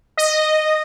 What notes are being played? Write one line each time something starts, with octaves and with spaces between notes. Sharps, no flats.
D#5